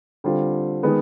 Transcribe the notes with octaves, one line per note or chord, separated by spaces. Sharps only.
D3 G3 C4 F4
D#3 G#3 B3